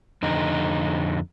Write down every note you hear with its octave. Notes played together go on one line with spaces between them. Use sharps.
F2 D3 D#4